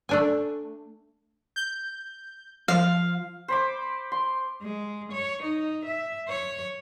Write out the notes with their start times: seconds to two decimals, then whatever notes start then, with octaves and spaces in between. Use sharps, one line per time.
0.09 A3 D4 G#5
1.56 G6
2.68 F3 F5
3.48 C5 B5 D6
4.12 C6
4.62 G#3
5.12 C#5
5.42 D#4
5.85 E5
6.28 C#5